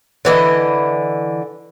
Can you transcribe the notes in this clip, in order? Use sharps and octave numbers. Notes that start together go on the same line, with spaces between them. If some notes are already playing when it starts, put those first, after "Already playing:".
D3 E3 D#5